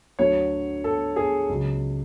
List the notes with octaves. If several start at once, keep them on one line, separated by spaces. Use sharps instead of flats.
D2 D3 F#3 C#5
A4
G#4
C#2 C#3 F#3